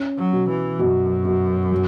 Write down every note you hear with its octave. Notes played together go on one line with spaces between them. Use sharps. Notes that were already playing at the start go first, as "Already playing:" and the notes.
Already playing: C#4
F#3
B2
E3
F#2 B2
B2
F#3